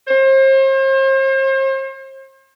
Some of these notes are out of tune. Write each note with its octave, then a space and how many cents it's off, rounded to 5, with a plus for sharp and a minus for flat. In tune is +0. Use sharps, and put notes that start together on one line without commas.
C5 +40